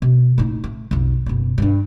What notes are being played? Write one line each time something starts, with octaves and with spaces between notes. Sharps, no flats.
B2
A2 D#4
A3
B1 F2
F#1 B2
G2 D4